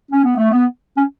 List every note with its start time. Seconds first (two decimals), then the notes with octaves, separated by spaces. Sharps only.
0.12 C#4
0.25 B3
0.37 A3
0.52 B3
0.97 C#4